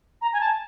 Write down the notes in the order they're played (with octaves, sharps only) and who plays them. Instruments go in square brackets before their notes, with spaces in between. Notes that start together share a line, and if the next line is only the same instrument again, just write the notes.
[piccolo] A#5
G#5
A5